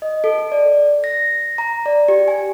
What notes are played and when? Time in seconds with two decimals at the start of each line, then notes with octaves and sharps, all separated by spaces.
0.02 D#5
0.24 A4
0.52 D5
1.04 A#6
1.58 A#5
1.86 D5
2.08 G4
2.28 G#5